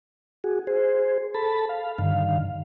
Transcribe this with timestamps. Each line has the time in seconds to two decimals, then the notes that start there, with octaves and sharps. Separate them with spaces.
0.44 F#4 G#4
0.67 G#4 C5
1.34 A4 A5 B5
1.69 F5
1.98 G2 D3 D#3 F5